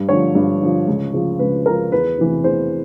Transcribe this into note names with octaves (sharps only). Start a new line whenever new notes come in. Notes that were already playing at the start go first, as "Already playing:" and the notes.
Already playing: G2
D3 F3 C#5
G2
D3 F3
C#2
C#3 F3
C#2 B4
C#3 F3 A#4
E2 B4
C3 E3
E2 C5